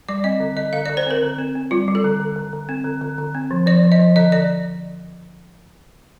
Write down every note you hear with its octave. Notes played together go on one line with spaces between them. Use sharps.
G3 D5
C4 D#5
D3
D3 D#5
D3 F5
D3 D5
C5
C4 A#4
D3
C4
C4
G3 F4
G3
A4
D3
D3
D3
D3
C4
D3
D3
D3
C4
F3
F3 D5
F3
D#5
F3
D3 D#5
D3 D5